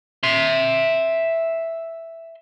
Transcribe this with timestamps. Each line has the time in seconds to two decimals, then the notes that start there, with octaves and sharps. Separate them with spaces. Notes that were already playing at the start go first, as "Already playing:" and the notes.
0.23 E5 C6